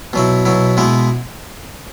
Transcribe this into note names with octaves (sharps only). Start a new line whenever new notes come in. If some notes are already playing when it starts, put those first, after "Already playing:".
B2 F#3 E4
B2 F#3 E4
B2 G#3 B3 E4